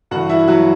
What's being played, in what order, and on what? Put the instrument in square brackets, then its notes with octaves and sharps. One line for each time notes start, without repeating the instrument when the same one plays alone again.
[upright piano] G2 E3 F#4 F#5
E4 E5
E4
F#3 F#4